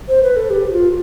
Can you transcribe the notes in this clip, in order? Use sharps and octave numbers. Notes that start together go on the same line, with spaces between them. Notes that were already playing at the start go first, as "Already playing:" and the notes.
C5
B4
A4
G4
G4
F4